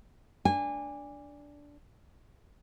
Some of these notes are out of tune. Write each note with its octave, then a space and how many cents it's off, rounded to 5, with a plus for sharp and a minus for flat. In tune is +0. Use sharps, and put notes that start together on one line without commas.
D4 -10 G#5 -25